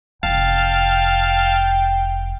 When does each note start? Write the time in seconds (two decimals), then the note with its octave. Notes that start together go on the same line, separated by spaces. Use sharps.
0.23 F1 F5 G5 A5